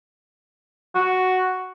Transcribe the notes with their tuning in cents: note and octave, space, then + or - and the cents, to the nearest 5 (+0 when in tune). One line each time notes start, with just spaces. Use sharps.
F#4 +5